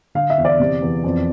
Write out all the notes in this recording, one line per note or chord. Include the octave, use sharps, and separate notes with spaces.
D3 F5
E5
E2
D5
C3
E2
F2